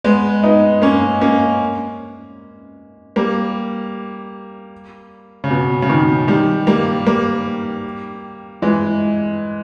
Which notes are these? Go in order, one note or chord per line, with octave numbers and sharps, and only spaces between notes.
G#3 B3
B3 D#4
A#3 C#4
A#3 C#4
G3 A#3
C#3
B2
C#3
B2 D#3
D#3 G3
G3 A#3
G3 A#3
E3 G#3